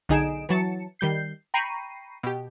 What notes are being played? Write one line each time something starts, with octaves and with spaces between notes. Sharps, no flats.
B1 D3 D#4 G#4 D7 E7
E3 F#3 A5 C#7
D#3 G3 G6 C7
G5 A#5 B5 C#6 C7 D#7
B2 G4